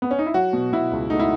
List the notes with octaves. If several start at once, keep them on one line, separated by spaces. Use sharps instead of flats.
B3
C#4
D#4
E4
F#3 F#4
B2
B2 E4
C#2
A3 D#4
E4